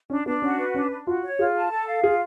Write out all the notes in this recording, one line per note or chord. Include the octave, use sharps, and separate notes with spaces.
C#4 D4
B3 D4
C#4 F#4
B4
C#4 D4
D4
F4 F#4
C#5
F4 G#4
A5
A4
F5
F4 G#4